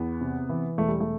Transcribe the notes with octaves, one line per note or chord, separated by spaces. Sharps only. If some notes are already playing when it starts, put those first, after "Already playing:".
Already playing: E2 B3
C3
E3
E1 A3
G3
A3